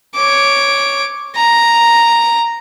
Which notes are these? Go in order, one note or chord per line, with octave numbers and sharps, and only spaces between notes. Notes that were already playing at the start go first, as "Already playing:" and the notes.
C#5 D6
A#5